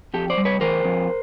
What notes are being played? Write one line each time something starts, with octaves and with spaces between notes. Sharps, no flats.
F2 G4 A4
C5 D5
G3
B4 C#5
E3 A#4 C5
F2